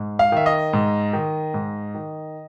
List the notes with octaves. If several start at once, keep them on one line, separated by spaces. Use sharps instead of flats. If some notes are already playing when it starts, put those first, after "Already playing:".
Already playing: G#2
F5
D#3 E5
D#5
G#2
D#3
G#2
D#3